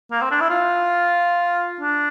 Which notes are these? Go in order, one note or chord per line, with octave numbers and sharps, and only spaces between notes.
A#3
C4
D4
E4
F4
D4